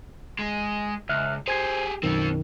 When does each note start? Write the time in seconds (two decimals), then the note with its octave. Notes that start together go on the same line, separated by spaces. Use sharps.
0.39 G#3
1.09 C#2 E5 F6 F#6
1.48 G4 G#4 C5 G#6 C7
2.03 B1 F#2 D#3 C4 F4